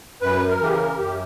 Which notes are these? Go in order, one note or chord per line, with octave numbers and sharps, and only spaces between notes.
F#2 B4
A#4
C#3 E3 G4
A#4
F#2 G4